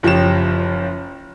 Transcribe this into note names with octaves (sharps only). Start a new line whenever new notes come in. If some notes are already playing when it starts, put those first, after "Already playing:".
F#1 F3 G4 C#5 E7